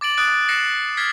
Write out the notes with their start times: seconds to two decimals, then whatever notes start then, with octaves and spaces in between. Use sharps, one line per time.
0.01 D6 A6 D7 F#7
0.17 D#6 F#6 A6 D7
0.48 F#6 A6 A#6 C7 C#7 E7
0.97 F6 G#6 A6 B6 C7